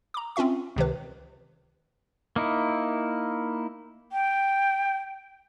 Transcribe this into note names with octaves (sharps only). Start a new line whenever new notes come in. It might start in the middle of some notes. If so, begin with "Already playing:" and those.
A#5 D6
C4 C#4 F4 E5 C#6
C#2 C3 D#3 B4
A#3 D#4 E4
G5